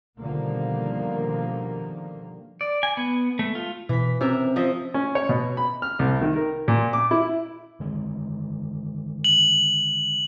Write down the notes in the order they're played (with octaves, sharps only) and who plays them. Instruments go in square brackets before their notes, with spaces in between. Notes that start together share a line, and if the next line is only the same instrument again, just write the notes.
[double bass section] B2 D3 D#3 F3 G3 A#3
[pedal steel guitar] D5
G#5
B3
A3
F4
[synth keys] B2 B6 [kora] E3
[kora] C3 A#4 E5 [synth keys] C#4
[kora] F3 D#5 E5
[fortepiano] C#4
C#5
B2
B5
F6
C2
D#3
A#4
A#2
D6
E4
[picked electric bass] D3 D#3 G#3
[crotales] F#7